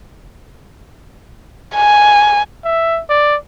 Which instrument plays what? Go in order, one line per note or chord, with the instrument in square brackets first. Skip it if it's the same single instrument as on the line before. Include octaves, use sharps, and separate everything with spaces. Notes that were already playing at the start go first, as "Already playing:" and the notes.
[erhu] G#5
[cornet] E5
D5